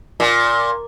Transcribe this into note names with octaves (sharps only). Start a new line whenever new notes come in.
A#2